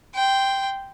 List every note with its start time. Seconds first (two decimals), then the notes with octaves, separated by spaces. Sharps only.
0.15 G5 C6